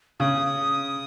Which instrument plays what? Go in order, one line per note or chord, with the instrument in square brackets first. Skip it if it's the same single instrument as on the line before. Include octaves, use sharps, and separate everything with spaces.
[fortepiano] C#3 [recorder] D#6